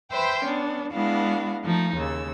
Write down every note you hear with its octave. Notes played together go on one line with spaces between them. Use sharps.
B4 C5 E5 G5 C6
B3 C#4 D4
G#3 B3 D4 E4 F#4 F5
F3 A3 D#4
D#2 C#3 E6